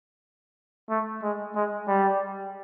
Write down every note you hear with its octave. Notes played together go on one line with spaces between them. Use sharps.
A3
G#3
G#3
G3